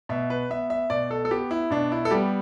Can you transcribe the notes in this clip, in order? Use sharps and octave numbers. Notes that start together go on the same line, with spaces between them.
B2 E5
B4
B3 E5
E5
B2 D5
A4
A4
B3 G4
E4
B2 D4
E4
A4
G3 B3 G4